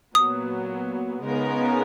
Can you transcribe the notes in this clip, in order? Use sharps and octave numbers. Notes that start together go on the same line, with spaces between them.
A#2 F#3 B3 D#6
C#3 G#3 B3 D#4 A#4